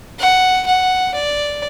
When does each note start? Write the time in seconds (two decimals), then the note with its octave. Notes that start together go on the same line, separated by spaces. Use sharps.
0.19 F#5
0.66 F#5
1.14 D5